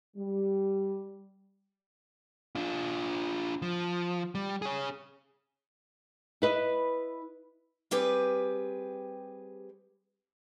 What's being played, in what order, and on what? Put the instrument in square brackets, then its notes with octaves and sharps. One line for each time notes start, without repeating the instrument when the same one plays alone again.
[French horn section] G3
[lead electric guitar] D4 F4
F3
G3
G#4 C#5
[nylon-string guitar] E4 B4 D#5
[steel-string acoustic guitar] G3 C4 G4 G#4 B4